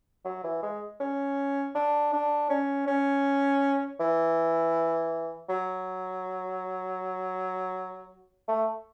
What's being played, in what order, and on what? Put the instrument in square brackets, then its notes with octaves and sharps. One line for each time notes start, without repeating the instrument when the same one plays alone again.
[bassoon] F#3
E3
G#3
C#4
D4
D4
C#4
C#4
E3
F#3
A3